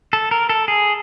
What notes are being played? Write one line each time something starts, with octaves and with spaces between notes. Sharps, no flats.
A4
A#4
A4
G#4